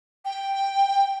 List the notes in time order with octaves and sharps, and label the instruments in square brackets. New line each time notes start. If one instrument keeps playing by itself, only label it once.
[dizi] G5